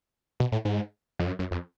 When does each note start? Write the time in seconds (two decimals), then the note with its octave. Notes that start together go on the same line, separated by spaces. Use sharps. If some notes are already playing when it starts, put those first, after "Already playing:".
0.40 B2
0.52 A2
0.65 G#2
1.19 F2
1.26 F#2
1.39 F#2
1.51 F2